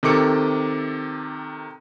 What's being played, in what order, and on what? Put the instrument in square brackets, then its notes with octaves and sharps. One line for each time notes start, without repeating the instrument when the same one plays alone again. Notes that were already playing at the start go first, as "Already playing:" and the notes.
[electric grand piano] C3 D#3 A4 D6 C#7